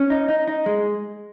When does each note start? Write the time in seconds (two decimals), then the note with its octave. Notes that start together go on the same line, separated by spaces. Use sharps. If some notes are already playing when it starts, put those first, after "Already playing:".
Already playing: C#4
0.10 D#4
0.29 D#4
0.48 D#4
0.66 G#3